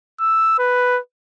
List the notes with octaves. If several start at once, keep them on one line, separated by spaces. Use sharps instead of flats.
E6
B4